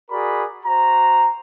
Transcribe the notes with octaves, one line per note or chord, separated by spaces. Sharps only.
F#4 G#4 A#4 D5 B5
F#4 C5 A#5